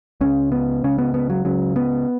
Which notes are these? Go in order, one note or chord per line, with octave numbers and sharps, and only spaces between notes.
C#2 C#3 C#4
B3
C#2 C#3 C#4
B3
B3
F#3
C#2 C#3 F#3
B3